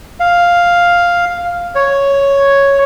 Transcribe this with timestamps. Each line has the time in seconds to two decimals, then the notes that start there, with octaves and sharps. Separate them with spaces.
0.20 F5
1.75 C#5